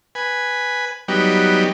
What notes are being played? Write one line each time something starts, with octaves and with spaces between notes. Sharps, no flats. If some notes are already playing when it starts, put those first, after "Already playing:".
B4 G#5
F#3 G3 B3 D#4 G4